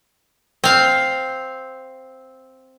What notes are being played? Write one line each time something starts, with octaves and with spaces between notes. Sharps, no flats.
C4 F5